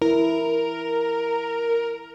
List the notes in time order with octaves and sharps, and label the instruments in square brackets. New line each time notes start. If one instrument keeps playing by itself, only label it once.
[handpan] E4 [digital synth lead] A#4